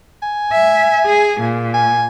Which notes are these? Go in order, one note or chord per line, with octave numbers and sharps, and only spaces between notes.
G#5
E5
G#4
A#2
G#5